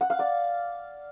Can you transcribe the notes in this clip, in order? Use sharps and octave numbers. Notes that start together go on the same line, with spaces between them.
F#5
F5
D5